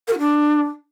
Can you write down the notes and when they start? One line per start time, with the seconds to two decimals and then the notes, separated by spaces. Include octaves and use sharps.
0.08 A#4
0.13 F#4
0.18 D4